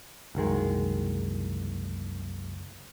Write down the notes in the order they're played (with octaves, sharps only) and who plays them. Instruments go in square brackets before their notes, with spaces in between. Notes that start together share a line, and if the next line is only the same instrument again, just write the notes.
[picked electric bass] F#1 C2 D#3 G#3